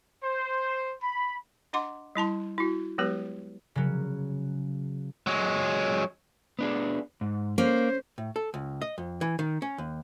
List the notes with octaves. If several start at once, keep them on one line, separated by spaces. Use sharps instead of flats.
C5
B5
D4 D#5 F#5 C6 D6
G3 E4 A5 C6
E4 F#4
F#3 G#3 B3 G4 B4
C#3 F#3
F#3 G#3
B3 D4 G#4
G#2
A#3 C#4 C5
A2
A4
C#2
D#5
F2
E3
D#3
C#4
D#2